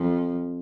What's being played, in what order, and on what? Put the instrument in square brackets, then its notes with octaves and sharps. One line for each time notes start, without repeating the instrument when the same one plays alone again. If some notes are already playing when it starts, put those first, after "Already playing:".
Already playing: [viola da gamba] F2